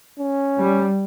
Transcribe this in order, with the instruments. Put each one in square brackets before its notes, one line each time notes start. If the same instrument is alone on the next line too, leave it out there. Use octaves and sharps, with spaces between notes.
[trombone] C#4
[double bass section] G3